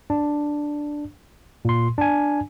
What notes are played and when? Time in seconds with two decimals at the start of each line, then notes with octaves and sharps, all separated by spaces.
0.10 D4
1.65 A#2 C6
1.98 D4 G#5